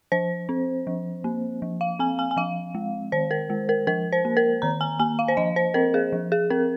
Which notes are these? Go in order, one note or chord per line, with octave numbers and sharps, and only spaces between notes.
F3 C5
C4
F3
A#3
F3
F5
C4 G#5
G#5
G#5
F3 F5
G#3
D#3 C5
A#4
G#3
A#4
F3 A#4
C5
A#3
A#4
D#3 A#5
G#5
A#3 G#5
F5
C5
F3 D#5
C5
C4 A#4
G#4
F3
G#4
C4 A#4